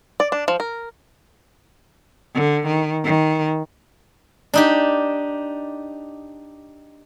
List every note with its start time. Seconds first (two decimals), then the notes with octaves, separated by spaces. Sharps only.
0.20 D5
0.32 D4
0.48 F3
0.60 A#4
2.35 D3
2.67 D#3
3.04 D#3
4.54 D4 D#4 G4